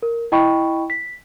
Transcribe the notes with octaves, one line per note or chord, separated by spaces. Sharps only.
A#4
E4 D#5 G5 B5 C#6
B6